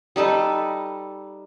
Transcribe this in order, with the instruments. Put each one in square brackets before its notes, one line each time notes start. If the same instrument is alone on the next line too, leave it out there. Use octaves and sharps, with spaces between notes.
[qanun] G3 D#4 A4 B4